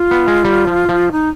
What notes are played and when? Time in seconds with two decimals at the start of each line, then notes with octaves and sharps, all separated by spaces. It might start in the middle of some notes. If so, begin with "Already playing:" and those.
Already playing: F4
0.11 B3
0.28 G#3
0.45 G3
0.67 F3
0.89 F3
1.12 D#4